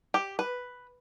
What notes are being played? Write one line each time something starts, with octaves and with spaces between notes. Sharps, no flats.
G4
B4